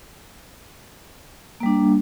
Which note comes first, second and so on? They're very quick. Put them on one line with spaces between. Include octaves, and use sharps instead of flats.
A#3 G3 D4